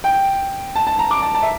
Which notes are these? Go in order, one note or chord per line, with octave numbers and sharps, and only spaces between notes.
G5
A5
A5
A#5
D6
A5
A5
E5